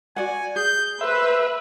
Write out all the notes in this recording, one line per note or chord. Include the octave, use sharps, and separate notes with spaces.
F#4 D5 F#5 G#5
G#4 G6
B4 C5 E5